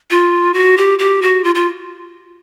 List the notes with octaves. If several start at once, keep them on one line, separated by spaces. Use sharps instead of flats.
F4
F#4
G4
G4
F#4
F4
F4